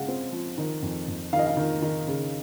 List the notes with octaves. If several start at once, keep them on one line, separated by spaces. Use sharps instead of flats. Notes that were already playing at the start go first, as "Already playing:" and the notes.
Already playing: C#3 G#3 F5 F#5
C4
F3
D#3
F2
F2
D#3 F5
D#5
F5
D#3
D#3
C#3